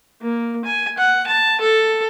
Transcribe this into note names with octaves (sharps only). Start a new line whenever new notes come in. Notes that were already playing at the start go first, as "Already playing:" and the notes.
A#3
G#5
F#5
A5
A4